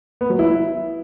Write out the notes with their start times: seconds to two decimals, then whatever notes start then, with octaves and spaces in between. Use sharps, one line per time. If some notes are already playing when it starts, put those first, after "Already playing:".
0.21 B3
0.30 F#3
0.39 E4